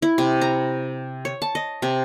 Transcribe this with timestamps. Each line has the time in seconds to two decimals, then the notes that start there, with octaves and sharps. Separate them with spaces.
0.02 E4
0.18 C3
0.41 A#5
1.25 C#5
1.42 A5
1.55 D#5
1.82 C3